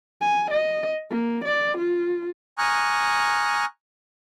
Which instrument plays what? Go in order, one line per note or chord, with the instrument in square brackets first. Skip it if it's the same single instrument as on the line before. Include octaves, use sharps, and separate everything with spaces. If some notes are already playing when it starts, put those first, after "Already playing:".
[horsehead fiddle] G#5
D#5
A#3
D5
F4
[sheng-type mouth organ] G#5 A#5 C#6 D#6 F6 F#6